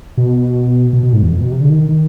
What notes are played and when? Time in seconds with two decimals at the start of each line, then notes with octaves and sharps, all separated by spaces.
0.17 B2
0.93 B2
1.03 B2
1.13 G#2
1.23 E2
1.31 F2
1.41 B2
1.51 C3
1.61 D3
1.70 D#3
1.89 D#3